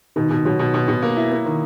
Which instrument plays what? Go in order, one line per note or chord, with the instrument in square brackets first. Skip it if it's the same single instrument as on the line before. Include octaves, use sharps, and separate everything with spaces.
[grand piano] B2 [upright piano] D#3
[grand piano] B2
[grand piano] B2 [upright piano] F#3
[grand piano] B2
B2
B2
A#3
E4
A#3
D#3